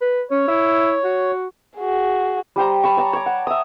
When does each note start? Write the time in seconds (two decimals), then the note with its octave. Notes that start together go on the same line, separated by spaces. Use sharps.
0.01 B4
0.31 C#4 C#5
0.48 E4
1.04 F#4
1.78 F#4 G#4
2.56 G3 G4 C5 A#5
2.83 A5 B5 C#6
2.97 C#5 A5 A#5
3.13 C#5 D6
3.26 F#5
3.47 E5 D#6